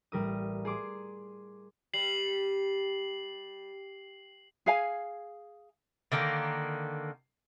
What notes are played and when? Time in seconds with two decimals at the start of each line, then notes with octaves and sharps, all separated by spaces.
0.12 A1 G3 A#4 D#6
0.65 G#4 C6 D6
1.94 G3 C7 F#7
4.66 G#4 F5 G#5
6.12 D3 D#3 A#3